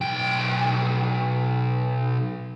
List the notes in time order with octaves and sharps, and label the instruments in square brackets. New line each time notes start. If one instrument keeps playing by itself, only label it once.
[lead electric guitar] B1 G5